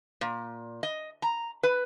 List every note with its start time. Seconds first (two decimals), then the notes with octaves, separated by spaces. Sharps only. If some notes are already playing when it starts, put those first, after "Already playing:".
0.21 A#2
0.83 D#5
1.22 A#5
1.63 B4